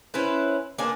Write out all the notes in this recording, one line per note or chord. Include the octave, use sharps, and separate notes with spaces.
C#4 E4 B4 C5
A#3 B3 D4 G#5